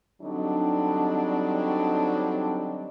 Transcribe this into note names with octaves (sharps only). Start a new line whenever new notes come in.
D3 F#3 G3 C4 D4 D#4